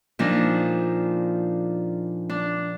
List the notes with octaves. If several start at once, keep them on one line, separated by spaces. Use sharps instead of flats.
A#2 F3 D4 D#4
D4